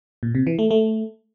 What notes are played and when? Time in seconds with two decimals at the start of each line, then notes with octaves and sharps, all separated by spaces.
0.23 A#2
0.35 C3
0.47 E3
0.59 A3
0.71 A3